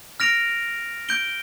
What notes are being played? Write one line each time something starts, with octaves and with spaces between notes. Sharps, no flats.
F6 A#6 D7 F7
G6 D7 G7